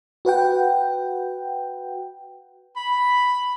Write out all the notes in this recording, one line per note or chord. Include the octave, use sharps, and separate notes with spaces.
F#4 B4 F#5 G5
B5